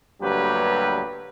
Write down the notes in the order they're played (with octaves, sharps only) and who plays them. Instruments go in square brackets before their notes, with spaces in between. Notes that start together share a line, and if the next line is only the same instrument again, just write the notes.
[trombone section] D2 G2 F#3 A#3 G4 B4